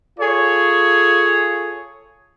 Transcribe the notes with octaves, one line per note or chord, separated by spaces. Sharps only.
F4 G#4 A4 C#5